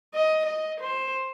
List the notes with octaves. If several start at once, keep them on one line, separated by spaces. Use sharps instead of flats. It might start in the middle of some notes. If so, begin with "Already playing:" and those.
D#5
D#5
C5